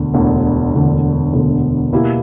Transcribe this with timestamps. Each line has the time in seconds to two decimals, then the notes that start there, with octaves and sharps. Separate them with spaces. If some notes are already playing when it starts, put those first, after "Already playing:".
Already playing: E1 D2 D3
0.14 E1 D2 D3
0.73 E1 D2 D3
1.33 E1 D2 D3
1.92 B2 A#3 E4 G4